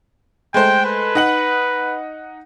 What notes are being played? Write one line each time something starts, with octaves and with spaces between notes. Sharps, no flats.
G#3 A3 C5 G5
B4
D#4 F#5 F#7